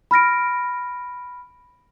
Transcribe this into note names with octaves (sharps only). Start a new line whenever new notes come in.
B5 F6 A#6 D7